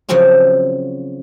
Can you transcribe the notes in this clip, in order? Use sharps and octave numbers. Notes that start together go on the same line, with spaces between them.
C#3 F3 F#3 C4 C#4 F#4